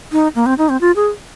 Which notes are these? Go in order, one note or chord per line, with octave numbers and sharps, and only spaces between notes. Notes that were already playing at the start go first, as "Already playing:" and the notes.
D#4
A#3
C4
D#4
C4
F4
G#4